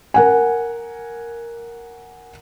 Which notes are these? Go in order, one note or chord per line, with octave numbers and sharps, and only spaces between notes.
A#4 F#5 G#5